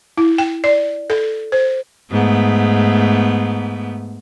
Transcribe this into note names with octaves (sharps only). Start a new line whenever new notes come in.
E4
G5
D5
A4
C5
G#2 A3 B3